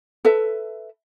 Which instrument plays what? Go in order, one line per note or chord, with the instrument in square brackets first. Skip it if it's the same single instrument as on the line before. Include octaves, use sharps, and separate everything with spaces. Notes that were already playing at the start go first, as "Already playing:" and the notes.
[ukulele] A4 B4 E5